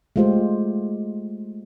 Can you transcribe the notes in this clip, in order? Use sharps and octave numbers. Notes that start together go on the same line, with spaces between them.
G#3 A3 F4 G4 C5